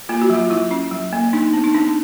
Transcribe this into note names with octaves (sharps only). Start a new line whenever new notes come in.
A#3 F4
F#4
F#3 F4
F#3 E4
C#4
F#3
A#3
D4 D#4
B3
D#4
B3 D4